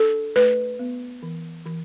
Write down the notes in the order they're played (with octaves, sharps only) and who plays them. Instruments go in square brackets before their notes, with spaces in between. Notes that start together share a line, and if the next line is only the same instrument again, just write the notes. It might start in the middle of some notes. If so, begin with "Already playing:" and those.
Already playing: [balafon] D4 A4
A3 B4
B3
E3
E3